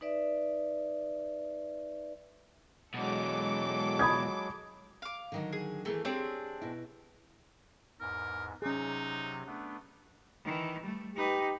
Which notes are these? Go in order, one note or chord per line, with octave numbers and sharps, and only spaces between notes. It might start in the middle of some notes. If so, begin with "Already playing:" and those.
D#4 B4 D5 E5
E2 B2 F#3 G#3 A4 D6
B5 D#6 G#6
F5 D6
D3 D#3 F#3
G#4
E3 A3 A#3 G#4
C4 D4 G4 G#4 C#5
B2 E4
E2 G#2 A#4
C3 F#3 C#4 D#4 G#4
A3 B3 D4
D#3 E3
G3 A3
D#4 G4 B4